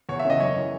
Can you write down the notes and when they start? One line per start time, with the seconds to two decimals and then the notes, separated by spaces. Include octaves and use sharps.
0.09 E2 C#5
0.19 E5
0.25 C#3 E3
0.30 D#5
0.40 F#2 C#5
0.56 E3